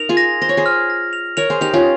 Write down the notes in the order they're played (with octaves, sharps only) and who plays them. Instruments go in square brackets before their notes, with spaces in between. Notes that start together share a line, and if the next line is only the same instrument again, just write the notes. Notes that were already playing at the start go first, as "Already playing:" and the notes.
Already playing: [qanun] D#4 A#4 [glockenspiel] F7
[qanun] F4 G#4
[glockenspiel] A#6
[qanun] C5 [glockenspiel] A#6
[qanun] C#5
G#4 C5
[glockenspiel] F6
A#6
F7
[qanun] A#4 C#5 [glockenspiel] F7
[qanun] G#4 C5
[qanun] D#4 G4 [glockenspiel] F7
[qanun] C#4 F4